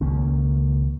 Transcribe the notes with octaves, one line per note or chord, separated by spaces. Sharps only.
C#2 D#3 A#3 C#4